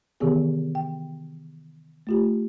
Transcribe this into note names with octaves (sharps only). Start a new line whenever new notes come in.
C3 D#3 E3 B3 G4 G#4
G5
A3 F4 G4